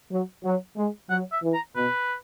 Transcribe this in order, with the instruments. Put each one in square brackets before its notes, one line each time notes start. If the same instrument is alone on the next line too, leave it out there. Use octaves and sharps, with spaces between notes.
[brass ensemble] F#3
F#3
G#3
[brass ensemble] F#3 [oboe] F#5
[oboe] E5
[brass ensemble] E3
[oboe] A#5
[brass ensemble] B2 [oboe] B4